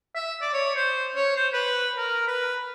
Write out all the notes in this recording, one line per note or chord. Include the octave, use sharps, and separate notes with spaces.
E5
D5
C#5
C5
C#5
C5
B4
A#4
B4